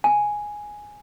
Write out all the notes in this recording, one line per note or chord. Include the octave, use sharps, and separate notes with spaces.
G#5